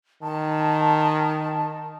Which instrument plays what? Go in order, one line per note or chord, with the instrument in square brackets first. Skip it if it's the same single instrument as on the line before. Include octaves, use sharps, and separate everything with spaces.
[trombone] D#3 [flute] A5